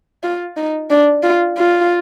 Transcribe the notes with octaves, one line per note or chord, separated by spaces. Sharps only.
F4
D#4
D4
F4
F4